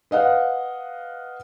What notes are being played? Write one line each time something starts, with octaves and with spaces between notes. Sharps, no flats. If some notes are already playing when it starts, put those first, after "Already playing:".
B4 D#5 F5 F#5